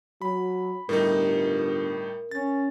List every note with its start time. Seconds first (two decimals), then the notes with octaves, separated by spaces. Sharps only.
0.22 F#3 B5
0.89 G1 A2 G3 D#4 A#4
2.31 C#4 A6